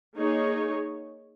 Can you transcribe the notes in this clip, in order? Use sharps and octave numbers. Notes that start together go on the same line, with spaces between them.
A#3 D#4 G#4 C#5